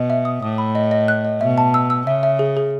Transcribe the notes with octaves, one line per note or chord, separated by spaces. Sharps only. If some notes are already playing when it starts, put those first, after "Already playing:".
Already playing: B2 D#5
E5
D#6
A2 D#6
B5
D#5
D#5
F#6
D#5
B2 E5
A5
E6
E6
C#3 E5
E5
G#4
G#4